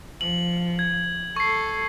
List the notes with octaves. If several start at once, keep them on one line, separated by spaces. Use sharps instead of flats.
F3 F#7
G#6
A4 C#6 C7